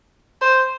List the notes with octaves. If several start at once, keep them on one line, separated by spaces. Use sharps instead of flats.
C5